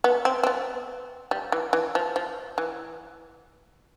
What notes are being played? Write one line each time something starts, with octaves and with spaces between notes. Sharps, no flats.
B3
C4
C4
B3
G3
E3
E3
F3
F3
E3